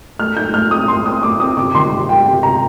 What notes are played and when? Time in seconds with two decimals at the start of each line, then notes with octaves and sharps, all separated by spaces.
0.19 A3 F6
0.37 D#4 G6
0.54 A2 F6
0.71 C4 D#6
0.88 A2 C6
1.05 C4 D#6
1.23 A2 D6
1.40 C4 D#6
1.57 C3 D6
1.75 D#3 C6
1.92 G3
2.09 G3 G5
2.26 C3 G5
2.43 C3 A#5